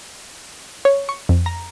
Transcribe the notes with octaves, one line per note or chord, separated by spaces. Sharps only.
C#5
C#6
F2
A#5